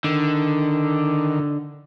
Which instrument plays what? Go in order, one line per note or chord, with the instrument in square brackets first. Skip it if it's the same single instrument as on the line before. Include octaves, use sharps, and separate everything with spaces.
[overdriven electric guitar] D3 [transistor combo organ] D#3